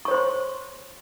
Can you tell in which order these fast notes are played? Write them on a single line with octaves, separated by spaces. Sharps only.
C#6 C#5 C5 C6